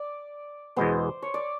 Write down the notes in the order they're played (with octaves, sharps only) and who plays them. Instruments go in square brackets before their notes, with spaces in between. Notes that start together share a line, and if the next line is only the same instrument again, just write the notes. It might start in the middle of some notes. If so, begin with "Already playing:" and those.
Already playing: [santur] D5
[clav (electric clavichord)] E2 B2 G#3 B3 [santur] C5
[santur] C#5
D5